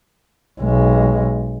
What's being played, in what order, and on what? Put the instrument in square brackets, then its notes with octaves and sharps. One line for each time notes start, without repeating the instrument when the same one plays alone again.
[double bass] B1 G#3